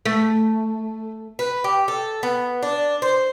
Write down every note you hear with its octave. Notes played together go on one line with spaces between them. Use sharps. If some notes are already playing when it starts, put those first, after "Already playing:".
A3
B4
G4
A4
B3
D4
C5